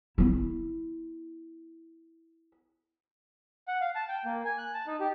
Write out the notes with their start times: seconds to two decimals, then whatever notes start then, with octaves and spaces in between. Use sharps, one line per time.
0.18 B3 E4
3.68 F#5
3.81 F5
3.95 A5
4.09 G5
4.25 A#3
4.45 G#5
4.58 F#6
4.74 A5
4.87 D#4
5.00 G4